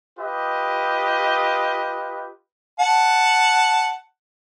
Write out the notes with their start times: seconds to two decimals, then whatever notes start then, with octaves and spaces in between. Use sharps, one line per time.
0.18 F4 G4 B4 D#5
2.79 F#5 A5